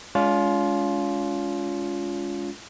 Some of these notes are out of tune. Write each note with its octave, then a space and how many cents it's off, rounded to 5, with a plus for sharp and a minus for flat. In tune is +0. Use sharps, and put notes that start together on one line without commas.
G#3 +0 C#4 +45 F4 +5